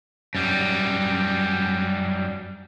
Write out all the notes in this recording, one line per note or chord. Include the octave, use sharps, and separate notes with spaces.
F#2 G3